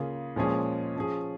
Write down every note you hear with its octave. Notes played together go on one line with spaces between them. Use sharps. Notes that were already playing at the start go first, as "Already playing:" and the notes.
Already playing: C#3 A#3 F4 G#4
A#2 F3 G#3 C#4 G#4
F3 C#4 G#4